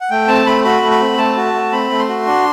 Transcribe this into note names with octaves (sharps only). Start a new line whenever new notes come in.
F#5
A3 G5
C4 A5
A3 B5
F#4 B5
A3
B5
C4
A3 A5
F#4
A3
C4 B5
A3
C6
F#4
D4